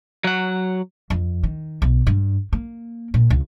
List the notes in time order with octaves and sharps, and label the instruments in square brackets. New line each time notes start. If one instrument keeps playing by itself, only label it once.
[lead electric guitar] F#3 F#5
[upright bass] F2
D#3
B1
G2
A#3
A#2
C#2